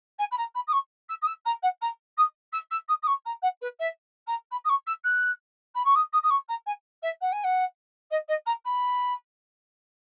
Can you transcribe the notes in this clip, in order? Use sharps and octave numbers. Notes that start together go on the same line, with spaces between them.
G#5
B5
A#5
B5
D#6
C#6
E6
D#6
E6
A#5
F#5
A#5
D#6
E6
E6
D#6
D#6
C#6
A#5
F#5
B4
E5
A#5
B5
D#6
C#6
E6
F#6
B5
C#6
D#6
D#6
D#6
C#6
A#5
G#5
E5
F#5
G#5
F#5
D#5
D#5
A#5
B5